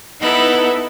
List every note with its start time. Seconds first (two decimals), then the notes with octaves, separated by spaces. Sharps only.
0.20 B3 D#4 E4 A4 B4